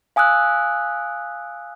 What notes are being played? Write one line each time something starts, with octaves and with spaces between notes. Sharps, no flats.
F5 G#5 D#6 E6 F#6